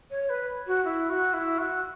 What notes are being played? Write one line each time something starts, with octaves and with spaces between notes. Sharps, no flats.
C#5
B4
F#4
E4
F#4
E4
F#4